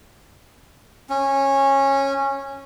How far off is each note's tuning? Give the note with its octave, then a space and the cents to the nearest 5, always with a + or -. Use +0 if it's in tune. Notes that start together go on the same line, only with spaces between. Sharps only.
C#4 -15